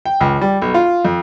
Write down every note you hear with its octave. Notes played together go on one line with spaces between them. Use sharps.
G5
C#2
G3
B1
F4
F2